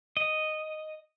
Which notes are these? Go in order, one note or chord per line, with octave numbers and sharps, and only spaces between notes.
D#5